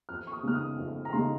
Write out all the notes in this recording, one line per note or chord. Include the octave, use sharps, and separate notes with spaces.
F2 F6
C#6
D#6
C#3 G#3 D#4 F6
D#6
F2
A#5
C#3 G#3 D#4 C6